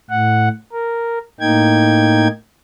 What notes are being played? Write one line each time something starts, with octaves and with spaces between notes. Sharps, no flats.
A2 F#5
A#4
A2 A#3 D#4 G5 G#6